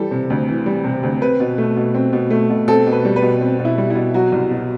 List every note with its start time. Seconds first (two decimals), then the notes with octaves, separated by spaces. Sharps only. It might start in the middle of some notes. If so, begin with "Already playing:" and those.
Already playing: E3 G3 A4
0.11 C3
0.30 D2
0.49 E3
0.66 G3
0.84 C3
1.03 D2
1.21 C4 B4
1.40 B2
1.58 A3
1.76 B2
1.94 C4
2.13 B2
2.31 A3
2.50 B2
2.68 C4 A4
2.87 B2
2.92 B4
3.05 G3
3.16 B4
3.22 B2
3.41 C4
3.59 B2
3.65 E4
3.78 G3
3.90 E4
3.95 B2
4.14 F#3 F#4
4.32 C2
4.51 B2